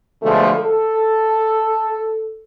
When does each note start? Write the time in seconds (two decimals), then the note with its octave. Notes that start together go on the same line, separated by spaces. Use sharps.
0.23 B2 D3 F3 G#3 A3
0.60 A4